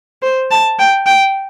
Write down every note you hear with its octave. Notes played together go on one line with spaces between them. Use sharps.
C5
A5
G5
G5